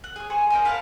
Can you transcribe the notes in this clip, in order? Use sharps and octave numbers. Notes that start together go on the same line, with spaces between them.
F#5
G#4 C#5
G#4 C5 G#5 C#6
A#3 A#4 C5 D#5
B4 F5 F#5 A5